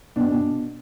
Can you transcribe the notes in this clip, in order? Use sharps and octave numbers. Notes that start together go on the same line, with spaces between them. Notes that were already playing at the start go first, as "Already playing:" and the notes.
B2 D4
B2